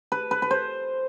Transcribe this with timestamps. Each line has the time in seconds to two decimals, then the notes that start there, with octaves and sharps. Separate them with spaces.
0.12 B4
0.31 B4
0.42 B4
0.51 C5